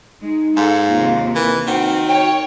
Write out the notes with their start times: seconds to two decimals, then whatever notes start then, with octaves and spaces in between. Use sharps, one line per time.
0.22 G#3 D#4
0.56 G#2 A4 F5
0.89 D#2 C3 F4
1.35 E3 A#4
1.67 D#3 C4 F#4 F#5
2.09 C#5 G5